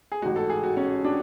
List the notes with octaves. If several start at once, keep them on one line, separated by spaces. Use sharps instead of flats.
G#4
A1 G#2 G#3 F#4
A4
G#4
F#4
C#4
D4